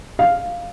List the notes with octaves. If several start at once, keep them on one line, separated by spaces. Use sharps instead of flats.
F5